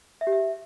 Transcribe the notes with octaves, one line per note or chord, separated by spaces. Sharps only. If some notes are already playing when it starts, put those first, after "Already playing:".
E5
G4
E5